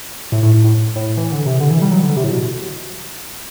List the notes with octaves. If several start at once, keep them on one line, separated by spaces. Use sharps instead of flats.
A2
A2
A2
A2
A2
E3
D3
C3
D3
E3
G3
F#3
D3
C3
A2
B2